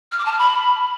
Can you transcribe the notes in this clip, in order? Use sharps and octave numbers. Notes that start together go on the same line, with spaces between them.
F6
D6
A5
F6
B5